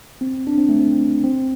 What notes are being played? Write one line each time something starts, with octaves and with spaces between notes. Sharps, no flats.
C4
D4
C4
A3
C4
C4